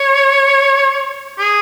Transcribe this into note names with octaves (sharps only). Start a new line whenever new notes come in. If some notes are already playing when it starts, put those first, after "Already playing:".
Already playing: C#5
G#4